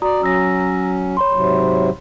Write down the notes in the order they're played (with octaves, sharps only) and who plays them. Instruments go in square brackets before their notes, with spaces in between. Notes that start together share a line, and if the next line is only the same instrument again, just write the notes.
[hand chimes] F#4 A#5 D#6 [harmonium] D5
[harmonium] F#3 C#4 [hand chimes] A#5 E6 A#6
[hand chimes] C#5 B5 C6
[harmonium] G#2 C3 F#3